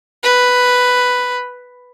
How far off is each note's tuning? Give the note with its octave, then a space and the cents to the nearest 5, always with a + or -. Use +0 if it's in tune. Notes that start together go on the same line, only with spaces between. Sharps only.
B4 +5